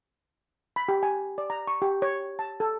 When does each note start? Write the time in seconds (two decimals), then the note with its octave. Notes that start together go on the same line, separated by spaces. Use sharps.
0.76 B5
0.89 G4
1.03 G#5
1.38 D5
1.50 A#5
1.67 C#6
1.82 G4
2.02 C#5
2.39 A5
2.60 A4